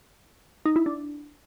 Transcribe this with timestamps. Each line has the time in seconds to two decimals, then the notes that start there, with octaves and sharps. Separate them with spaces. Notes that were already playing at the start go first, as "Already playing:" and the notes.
0.66 D#4
0.76 E4
0.86 D4